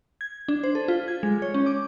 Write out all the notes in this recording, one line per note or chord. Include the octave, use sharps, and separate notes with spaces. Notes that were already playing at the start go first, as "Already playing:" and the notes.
G#6
D4
C5
A4
F4
G#6
G#3
C#5
C#4
D6